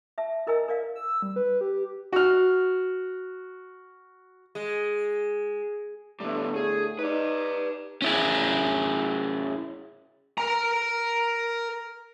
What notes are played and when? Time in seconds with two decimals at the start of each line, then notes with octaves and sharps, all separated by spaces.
0.18 E5 A5
0.47 E4 A#4 D#5 G#5 E6
0.68 A#4 D5 F5
0.95 E6
1.22 G3
1.36 B4
1.61 G4
2.13 F#4 F6
4.55 G#3
6.20 A2 D3 G3 A3 B3
6.56 G#4
6.99 D#4 B4 D5
8.02 C#4 E4 G#4
10.38 A#4 A#5